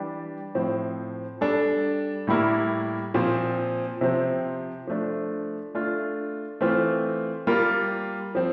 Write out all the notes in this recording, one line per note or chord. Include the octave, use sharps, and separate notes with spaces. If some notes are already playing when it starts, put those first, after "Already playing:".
Already playing: E3 G3 D4 G4
A2 F3 C4
G3 D4 A4
A2 G3 A#3 E4 A#4
A#2 F3 C4
C3 F3 C4
F3 A3 D4
A3 D4 F4
E3 A3 C4 F4
G3 A#3 F4 A#4
F3 C4